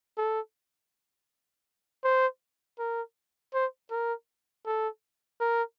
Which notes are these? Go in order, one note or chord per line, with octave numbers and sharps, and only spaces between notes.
A4
C5
A#4
C5
A#4
A4
A#4